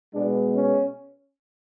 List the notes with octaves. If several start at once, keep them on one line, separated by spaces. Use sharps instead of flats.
B2 G#3 B3 D4
C#4